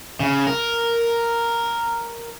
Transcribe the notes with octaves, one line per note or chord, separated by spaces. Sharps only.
C#3
A#4